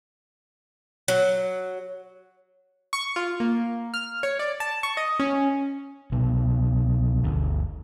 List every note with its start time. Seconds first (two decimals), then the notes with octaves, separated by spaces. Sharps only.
1.08 F#3
2.93 C#6
3.16 F4
3.40 A#3
3.94 F6
4.23 C#5
4.39 D5
4.60 A5
4.83 C#6
4.97 D#5
5.20 C#4
6.12 C2 B2 B3
7.23 G1 D2